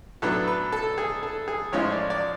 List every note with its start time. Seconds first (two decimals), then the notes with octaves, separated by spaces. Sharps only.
0.22 A2 F#3 B3 D4 A4
0.48 B4
0.72 A4
0.98 G#4
1.23 A4
1.48 G#4
1.72 A2 F3 G#3 C#4 F4 C#5
1.92 D5
2.10 D5